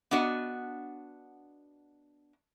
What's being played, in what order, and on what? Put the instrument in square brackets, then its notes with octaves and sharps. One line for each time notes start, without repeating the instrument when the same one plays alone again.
[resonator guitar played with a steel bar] B3 D4 F#4 D#5